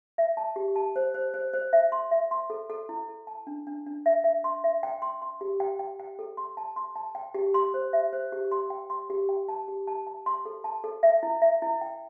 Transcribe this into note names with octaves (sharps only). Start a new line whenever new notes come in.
E5
A5
G4
A5
C5
C5
C5
C5
E5
C6
E5
C6
A4
A4
E4
A4
A5
D4
D4
D4
E5
E5
C6
E5
G5
C6
C6
G4
G5
G5
G5
A4
C6
A5
C6
A5
G5
G4
C6
C5
E5
C5
G4
C6
G5
C6
G4
G5
A5
G4
A5
A5
C6
A4
A5
A4
E5
E4
E5
E4
G5